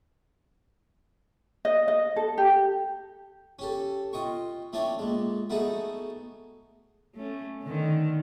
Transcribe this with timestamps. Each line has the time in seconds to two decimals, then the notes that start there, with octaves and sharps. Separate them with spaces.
1.65 D#5
1.88 D#5
2.16 A4
2.38 G4
3.59 C#4 G4 A4
4.13 F4 D#5 G5 C#6
4.73 A3 C#4 D4 E4 C#5 G5
4.99 A#2 G#3
5.50 A3 B3 D#4 F#4 G#4 A4
7.16 A3 C#4
7.63 D3 D#3